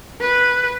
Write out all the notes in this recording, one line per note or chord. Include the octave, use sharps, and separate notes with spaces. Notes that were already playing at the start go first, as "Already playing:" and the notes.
B4